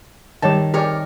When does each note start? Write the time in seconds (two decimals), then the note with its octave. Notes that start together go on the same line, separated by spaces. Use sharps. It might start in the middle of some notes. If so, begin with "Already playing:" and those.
0.42 D#3 G3 C#5 A5
0.74 G4 G#4 A#4 C#5 D5